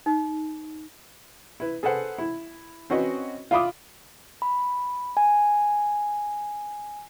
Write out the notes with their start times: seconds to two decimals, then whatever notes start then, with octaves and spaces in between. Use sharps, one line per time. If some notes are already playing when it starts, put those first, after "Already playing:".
0.06 D#4
1.60 E4 B4
1.83 G#4 A4 B4 C5 F#5
2.18 E4
2.90 C4 C#4 F#4 B4 D#5
3.51 F4 E5 F5 B5 D6 D#6
4.42 B5
5.17 G#5